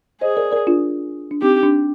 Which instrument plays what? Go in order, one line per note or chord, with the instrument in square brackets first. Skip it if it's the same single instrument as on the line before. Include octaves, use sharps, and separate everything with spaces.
[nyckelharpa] G#4 [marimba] C5 D#5
[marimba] A#4 D5
A#4 D5
D4 F4
D4
[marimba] C4 D#4 [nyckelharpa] G4
[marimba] D4